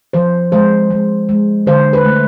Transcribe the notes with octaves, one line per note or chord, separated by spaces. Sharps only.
F3 C5
G#3 C5
G#3
G#3
D3 C5
B4
A3